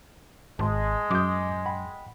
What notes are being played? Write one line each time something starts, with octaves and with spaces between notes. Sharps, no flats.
G#1 G#3 A5 C6
F#2 D6 D#6 G6
F#5 G5 B5